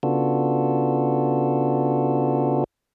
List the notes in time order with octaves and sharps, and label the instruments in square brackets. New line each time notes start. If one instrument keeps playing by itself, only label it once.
[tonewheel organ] C#3 B3 D4 F4 F#4 A4